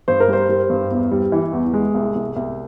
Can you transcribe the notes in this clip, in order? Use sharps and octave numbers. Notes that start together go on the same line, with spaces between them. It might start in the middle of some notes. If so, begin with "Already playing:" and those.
G2 C5
A#4
G3 C5
G3
G2
E2
G3
E3
E2
G#3
C2
C2
C2